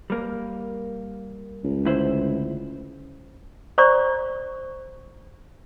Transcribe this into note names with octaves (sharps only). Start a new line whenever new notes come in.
G3 A#3
C#2
D2 E4 C5
C5 D5 A#5 C#6